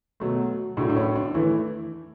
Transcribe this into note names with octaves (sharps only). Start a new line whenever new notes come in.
B2 F#3 A3
A2 F#3 A3 D4
D4
C#4
D4
E3 A3 E4